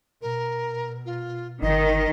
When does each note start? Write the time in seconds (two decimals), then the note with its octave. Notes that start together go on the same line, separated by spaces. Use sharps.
0.21 B2 A#4
1.05 F4
1.62 G1 D#3 D#5